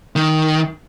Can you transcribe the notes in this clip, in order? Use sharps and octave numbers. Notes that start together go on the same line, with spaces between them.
D#3